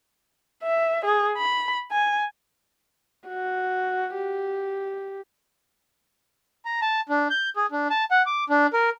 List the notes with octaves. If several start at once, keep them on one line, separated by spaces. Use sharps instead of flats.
E5
G#4
B5
G#5
F#4
G4
A#5
A5
D4
G6
G#4
D4
A5
F#5
D6
D4
A#4